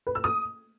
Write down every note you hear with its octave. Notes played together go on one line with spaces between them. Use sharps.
B4
E6
D#6